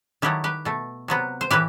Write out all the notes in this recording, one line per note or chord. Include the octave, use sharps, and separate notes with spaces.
D#3 F#3 A3 E4 G4
G4 B4
B2 A3
C3 F#3 B3
C5
A2 E3 G4 B4